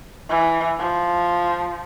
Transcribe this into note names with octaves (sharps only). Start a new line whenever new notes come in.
E3
F3